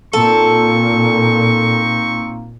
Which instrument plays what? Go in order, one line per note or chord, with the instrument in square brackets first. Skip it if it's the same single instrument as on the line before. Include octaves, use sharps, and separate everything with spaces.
[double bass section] A#2 [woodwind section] A#3 C4 D#4 [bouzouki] A4 [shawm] C#6